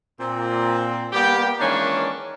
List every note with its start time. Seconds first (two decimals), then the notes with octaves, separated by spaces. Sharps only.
0.20 A#2 C4
1.13 G3 A#3 B3 G4
1.60 D#3 E3 G#3 A#3 C#4 D4